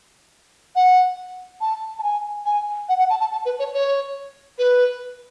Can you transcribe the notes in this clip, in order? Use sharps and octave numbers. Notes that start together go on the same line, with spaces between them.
F#5
A5
A5
G#5
G#5
F#5
F#5
A5
A5
A5
B4
C#5
C#5
B4